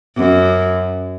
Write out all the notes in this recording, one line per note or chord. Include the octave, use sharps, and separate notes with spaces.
F#2